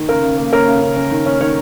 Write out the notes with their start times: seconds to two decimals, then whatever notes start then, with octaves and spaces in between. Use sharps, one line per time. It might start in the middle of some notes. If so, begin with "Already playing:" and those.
Already playing: D#3
0.09 C#3 A#4
0.23 C#3
0.38 A#3
0.53 C#4 A#4
0.67 C#3
0.82 C#3
0.96 C#4
1.11 D#3
1.26 C#4
1.41 D#3 C#5